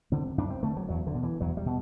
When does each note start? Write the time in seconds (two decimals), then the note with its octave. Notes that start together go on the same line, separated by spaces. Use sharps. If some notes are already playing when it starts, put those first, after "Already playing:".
0.12 D3 C4
0.38 F#2 D4
0.50 C4
0.63 D3 A3
0.77 F#3
0.89 E2 F#3
1.07 D3
1.15 B2
1.23 E3
1.40 E2 F#3
1.57 G3
1.66 B2